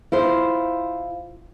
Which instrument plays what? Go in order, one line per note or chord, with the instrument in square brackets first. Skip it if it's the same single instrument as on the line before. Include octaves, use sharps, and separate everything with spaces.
[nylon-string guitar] E4 F4 C5